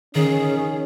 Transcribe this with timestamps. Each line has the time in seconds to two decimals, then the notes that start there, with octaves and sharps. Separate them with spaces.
0.15 D#3 C#4 G#4